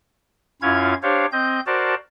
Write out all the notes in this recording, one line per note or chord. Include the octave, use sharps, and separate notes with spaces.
F#2 C#4 E4 F4 F5 G#6
D4 G4 C5 C#5 F5
C4 D#5 G6
F#4 A#4 C5 D5 A5